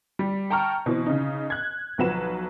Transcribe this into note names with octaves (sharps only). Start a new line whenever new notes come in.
G3
G5 A5 A#5 C#6 F6
B2 E3 C4
C#3 D#4
F#6 G#6
B1 F3 F#3 B4 F#5 E7